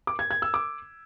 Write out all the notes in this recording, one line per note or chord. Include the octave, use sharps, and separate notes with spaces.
D6
G#6
G#6
E6
D6